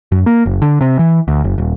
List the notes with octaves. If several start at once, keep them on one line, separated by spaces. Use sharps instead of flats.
F#2
A#3
F#1
D3
C3
E3
D2
F#1
D#1